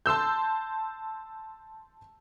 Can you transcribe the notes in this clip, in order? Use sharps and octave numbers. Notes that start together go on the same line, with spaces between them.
A5 C6 E6 G6